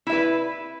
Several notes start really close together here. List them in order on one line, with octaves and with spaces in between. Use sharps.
E4 E5 B4